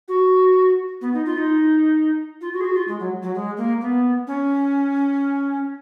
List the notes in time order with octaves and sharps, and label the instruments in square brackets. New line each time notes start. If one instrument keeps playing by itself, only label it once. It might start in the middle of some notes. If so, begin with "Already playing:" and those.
[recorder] F#4
B3
D#4
F4
D#4
F4
F#4
G#4
F#4
F4
G#3
F#3
F#3
G#3
A#3
B3
C#4